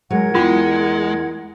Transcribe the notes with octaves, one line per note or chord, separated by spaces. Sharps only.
F#3 G#3 A#4 F#5 G#6
E2 G#3 F4 G5